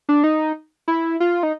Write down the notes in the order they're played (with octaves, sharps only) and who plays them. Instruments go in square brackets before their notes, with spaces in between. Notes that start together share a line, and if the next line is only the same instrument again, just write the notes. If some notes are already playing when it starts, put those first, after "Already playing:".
[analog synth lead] D4
D#4
E4
F4
D#4